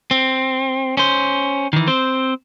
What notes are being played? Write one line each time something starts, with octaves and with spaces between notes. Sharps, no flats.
C4
C#4 C5
D#3 E3
C4 C5